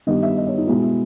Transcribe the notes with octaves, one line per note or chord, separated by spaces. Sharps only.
G2 D#3 G3 B3 D#5
E5
D#5
C#5
D#4
B2 G#3 B3 E4
E4